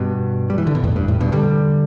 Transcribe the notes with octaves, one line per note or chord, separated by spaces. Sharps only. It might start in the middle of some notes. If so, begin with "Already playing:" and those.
Already playing: G2 B2
G3
E3
D3
B2
E2 A2
G2
E2 A2
G2 B2
D3 G3